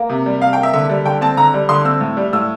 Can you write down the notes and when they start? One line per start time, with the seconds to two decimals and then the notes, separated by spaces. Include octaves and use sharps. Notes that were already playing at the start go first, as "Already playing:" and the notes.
Already playing: A#3
0.09 C3
0.26 G3
0.41 C3 F5
0.53 G5
0.57 A#3
0.63 E5
0.73 D3 E5
0.89 G3
1.06 D3 G5
1.21 C4 A5
1.37 D3 A#5
1.54 G3
1.69 D3 C6
1.85 C4 E6
2.01 A2
2.17 G3
2.33 A2 E6